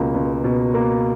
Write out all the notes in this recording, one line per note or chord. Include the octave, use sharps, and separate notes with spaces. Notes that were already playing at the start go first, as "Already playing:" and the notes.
Already playing: C#2 B2 A#3
C#2
B2
A#3